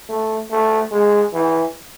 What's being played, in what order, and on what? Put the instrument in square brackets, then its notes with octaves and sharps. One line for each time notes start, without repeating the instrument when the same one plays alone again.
[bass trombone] A3
A3
G#3
E3